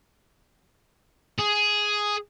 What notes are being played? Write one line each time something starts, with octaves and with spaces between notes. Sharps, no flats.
G#4